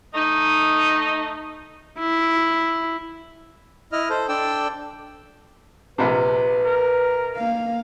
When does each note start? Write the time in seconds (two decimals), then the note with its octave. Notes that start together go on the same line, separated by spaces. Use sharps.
0.15 A3 D#4
1.99 E4
3.92 E4 D#5 F6
4.10 A4 C5
4.29 D4 A4 D5 G5 E6
5.98 A#1 C3 B4
6.65 A#4
7.36 A#3 F5